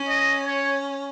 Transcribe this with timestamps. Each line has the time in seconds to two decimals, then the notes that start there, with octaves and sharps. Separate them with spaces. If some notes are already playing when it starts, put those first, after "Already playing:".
Already playing: C#4
0.09 D#5
0.46 C#5